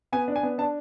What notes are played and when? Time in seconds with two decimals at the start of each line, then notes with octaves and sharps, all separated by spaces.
0.12 B3 G#5
0.28 D4
0.36 G#5
0.43 B3
0.58 D4 A5